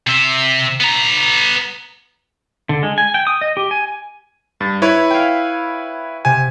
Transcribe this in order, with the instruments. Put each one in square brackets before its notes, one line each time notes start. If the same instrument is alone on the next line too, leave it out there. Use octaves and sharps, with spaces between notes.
[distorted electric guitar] C3 E5
B3 A#5
[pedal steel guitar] D3
G#3
G#5
G5
D#6
D#5
G4
G#5
[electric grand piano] G2 [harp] A6
[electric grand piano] E4 B4 C#5
[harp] F5 G5
[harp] C3 [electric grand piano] G#5